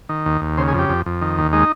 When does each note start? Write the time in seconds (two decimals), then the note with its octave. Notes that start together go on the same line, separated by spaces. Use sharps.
0.09 D#3
0.26 D#2
0.41 D#2
0.58 C#3 C5
0.68 G#4
0.74 F2 G4
0.89 F2
1.06 F2
1.22 D#3
1.38 D#2
1.53 G#3 D#4